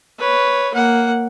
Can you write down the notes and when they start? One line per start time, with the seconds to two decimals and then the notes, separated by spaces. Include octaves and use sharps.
0.19 B4 C#5
0.74 A#3 F#5